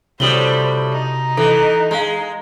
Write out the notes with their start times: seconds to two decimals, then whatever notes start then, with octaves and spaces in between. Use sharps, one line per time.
0.20 A2 C3 G3 F#4 C5 D#6 F#7 G7
0.92 D#4
1.37 E3 A4
1.91 G#3 F5 A#5